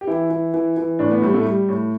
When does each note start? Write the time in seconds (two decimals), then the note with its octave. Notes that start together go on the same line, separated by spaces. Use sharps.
0.01 G4
0.07 E3 E4
0.30 E3
0.54 E3
0.77 E3
0.99 A2 D4
1.11 B3
1.22 A2 G3
1.34 A3
1.45 G3
1.69 A2